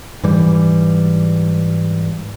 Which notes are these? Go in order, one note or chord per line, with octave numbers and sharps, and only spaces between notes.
G#2 E3 G3